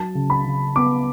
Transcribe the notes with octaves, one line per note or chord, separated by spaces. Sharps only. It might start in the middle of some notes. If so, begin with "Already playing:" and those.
Already playing: F#3 A5
C#3
B5
C#3
B3 D6